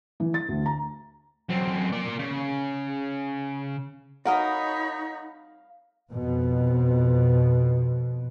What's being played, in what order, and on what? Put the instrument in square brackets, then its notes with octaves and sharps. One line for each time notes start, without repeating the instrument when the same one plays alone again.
[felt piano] E3
A6
D2
A#5
[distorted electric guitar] F#2 C4
A#3 D5
C#3
[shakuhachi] D#4 [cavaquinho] F#4 A#4 D#5 [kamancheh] C#5 B5 [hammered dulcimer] F5
[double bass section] F2 B2